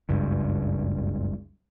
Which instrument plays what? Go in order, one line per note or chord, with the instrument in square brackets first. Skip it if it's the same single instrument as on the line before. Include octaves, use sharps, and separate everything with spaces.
[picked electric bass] F#1 C#2 G2